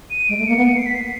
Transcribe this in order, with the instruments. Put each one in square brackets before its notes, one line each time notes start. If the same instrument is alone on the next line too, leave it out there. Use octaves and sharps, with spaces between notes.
[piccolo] D#7
[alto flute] G#3 [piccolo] D7
[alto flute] A3
[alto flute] A#3 [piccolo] C#7
[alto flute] B3
[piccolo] C#7
C7
B6
C7